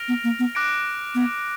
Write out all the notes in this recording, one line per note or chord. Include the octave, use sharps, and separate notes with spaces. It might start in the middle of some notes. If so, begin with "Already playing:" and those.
Already playing: F6 A#6 D7 F7
B3
A#3
B3
D6 F#6 A#6 D7
B3